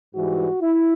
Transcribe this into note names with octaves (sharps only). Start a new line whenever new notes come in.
G#2 E3 G3 F#4
E4